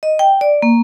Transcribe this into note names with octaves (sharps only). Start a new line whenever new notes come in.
D#5
G5
D5
A#3